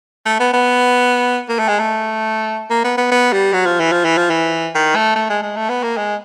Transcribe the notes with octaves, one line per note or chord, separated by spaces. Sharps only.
A3
B3
B3
A#3
A3
G#3
A3
A#3
B3
B3
B3
G3
F#3
F3
E3
F3
E3
F3
E3
D#3
A3
A3
G#3
G#3
A3
B3
A#3
G#3